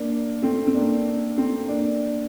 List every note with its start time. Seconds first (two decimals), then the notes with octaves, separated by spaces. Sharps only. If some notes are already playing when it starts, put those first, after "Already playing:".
Already playing: A#3 D4
0.42 A3 C4
0.67 C4
0.74 A#3 D4
1.37 A3 C4
1.69 A#3 D4